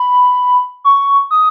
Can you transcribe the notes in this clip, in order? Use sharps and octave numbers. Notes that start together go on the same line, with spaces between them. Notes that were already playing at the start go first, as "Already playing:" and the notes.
Already playing: B5
C#6
D#6